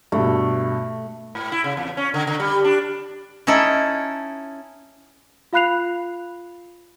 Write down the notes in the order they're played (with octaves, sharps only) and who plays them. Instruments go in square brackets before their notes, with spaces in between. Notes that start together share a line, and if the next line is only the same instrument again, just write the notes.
[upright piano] G2 B2 [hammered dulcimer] A3
[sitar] G#2
E4
C#3
E2
C#4
D3
D3
G3
D4
[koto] C#4 D#4 E4 A4
[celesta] F4 F5 B5 F#6 C7 F7